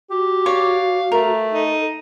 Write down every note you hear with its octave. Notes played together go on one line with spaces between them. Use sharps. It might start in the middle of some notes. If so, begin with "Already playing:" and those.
F#4 G4
C#5 D5 F5
A3 A#4
D#4 A4